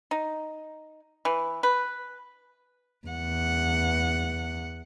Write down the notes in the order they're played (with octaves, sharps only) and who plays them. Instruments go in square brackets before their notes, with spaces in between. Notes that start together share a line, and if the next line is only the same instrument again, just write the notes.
[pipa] D#4
E3
B4
[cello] E2 F#5